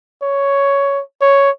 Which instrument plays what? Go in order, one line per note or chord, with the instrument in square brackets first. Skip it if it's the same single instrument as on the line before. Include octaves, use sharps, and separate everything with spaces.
[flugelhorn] C#5
C#5